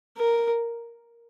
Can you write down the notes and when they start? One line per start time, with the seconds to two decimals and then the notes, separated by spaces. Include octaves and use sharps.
0.18 A#4